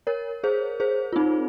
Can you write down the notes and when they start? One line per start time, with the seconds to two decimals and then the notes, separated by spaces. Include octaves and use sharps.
0.07 A#4 C#5
0.44 G#4 C5
0.80 G#4 C5
1.13 F4
1.16 C4 D#4